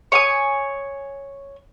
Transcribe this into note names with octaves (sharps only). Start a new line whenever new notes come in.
C#5 G#5 D#6